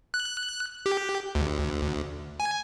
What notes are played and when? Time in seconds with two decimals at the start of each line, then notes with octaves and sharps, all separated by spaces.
0.14 F#6
0.86 G4
1.35 D2
2.40 G#5